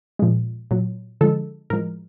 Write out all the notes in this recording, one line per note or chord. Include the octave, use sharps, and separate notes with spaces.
A#2 F3 G#3
A#2 F#3
D3 F3 G#3 A4
A2 F3 G#3 A#4